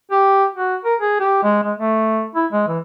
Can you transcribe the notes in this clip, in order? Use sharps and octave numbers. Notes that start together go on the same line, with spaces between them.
G4
F#4
A#4
G#4
G4
G#3
G#3
A3
E4
G#3
E3